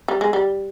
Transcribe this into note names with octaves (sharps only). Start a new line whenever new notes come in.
G3
G#3
G3